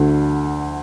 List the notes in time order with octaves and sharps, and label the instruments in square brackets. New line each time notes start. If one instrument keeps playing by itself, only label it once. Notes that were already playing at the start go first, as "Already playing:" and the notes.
Already playing: [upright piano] D2 D3 A3